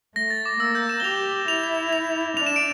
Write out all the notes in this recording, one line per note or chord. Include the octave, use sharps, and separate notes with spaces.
A3 A#6
A6
D6
A#3 E6
G6
E7
G7
G4 F7
E4 F7
F7
F7
D4 F7
E7
D7